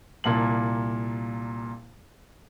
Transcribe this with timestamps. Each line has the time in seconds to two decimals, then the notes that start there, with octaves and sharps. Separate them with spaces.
0.24 C2 A#2 A#3 A5 F#7